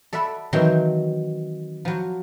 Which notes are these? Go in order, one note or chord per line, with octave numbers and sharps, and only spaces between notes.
A4 D5 E5 F#5 B5
D#3 E3 F#3 C4 F#4 G5
F3 F#3